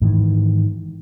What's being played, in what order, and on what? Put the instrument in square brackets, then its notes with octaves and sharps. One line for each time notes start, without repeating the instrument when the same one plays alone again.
[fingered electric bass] G#2 D#3 E3